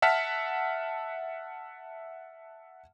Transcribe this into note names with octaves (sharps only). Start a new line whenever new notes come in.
E5 F#5 A5 F6 B6